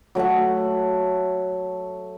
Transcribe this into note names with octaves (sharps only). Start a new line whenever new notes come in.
F#3 A3 E5 F#5